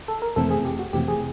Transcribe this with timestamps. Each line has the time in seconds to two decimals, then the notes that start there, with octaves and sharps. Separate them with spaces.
0.08 A4
0.22 A#4
0.36 F2 C3 E3 A3 C4 A4
0.50 G#4
0.65 G4
0.79 F#4
0.93 F2 C3 E3 A3 C4 G4
1.08 G#4